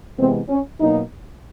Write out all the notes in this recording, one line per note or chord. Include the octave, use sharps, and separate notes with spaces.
C3 E3 G#3 B3 C4
C#4
B2 F#3 A#3 D#4